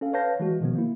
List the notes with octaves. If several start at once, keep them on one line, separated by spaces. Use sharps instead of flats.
C#4 A4 F5
B4 C#5 F5 A5 G6 A#6
E3 G#3 F#4
B2 D#3 F3 B3
A#3 E4